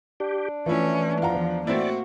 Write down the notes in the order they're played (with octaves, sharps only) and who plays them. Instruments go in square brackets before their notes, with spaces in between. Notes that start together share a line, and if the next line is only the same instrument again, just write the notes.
[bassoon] D4 [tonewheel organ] G4
[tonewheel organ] E3 [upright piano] F3 E4 [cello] A3 C#4
[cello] E2 F3 [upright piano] F4 F#5 A#5
[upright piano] A2 C4 E4 [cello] A#3 F#4 [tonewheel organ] D5